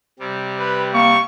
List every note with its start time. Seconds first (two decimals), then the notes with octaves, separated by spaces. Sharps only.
0.19 C3 G3
0.59 B4
0.94 A#3 C#6